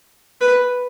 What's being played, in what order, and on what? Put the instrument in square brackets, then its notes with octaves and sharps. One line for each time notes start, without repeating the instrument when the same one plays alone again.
[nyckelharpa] B4